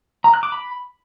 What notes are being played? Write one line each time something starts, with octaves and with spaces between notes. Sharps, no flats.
A#5
F#6
D6
B5